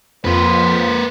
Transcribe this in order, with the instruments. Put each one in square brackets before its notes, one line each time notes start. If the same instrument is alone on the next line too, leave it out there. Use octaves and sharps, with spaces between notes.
[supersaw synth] F2 [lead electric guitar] A#3 B4 [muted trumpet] C5